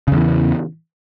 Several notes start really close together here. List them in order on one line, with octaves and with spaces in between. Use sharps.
C#3 E2 E3